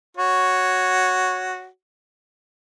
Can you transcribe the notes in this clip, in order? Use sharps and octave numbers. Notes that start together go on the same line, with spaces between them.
F#4 C#5